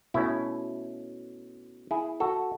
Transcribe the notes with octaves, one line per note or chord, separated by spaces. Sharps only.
B2 A3 C#4 E4
E4 G#4
F#4 A4